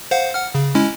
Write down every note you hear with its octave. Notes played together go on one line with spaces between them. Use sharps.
C5 F5 F#5
F#5 F6
C#3
G#3 C#4 E4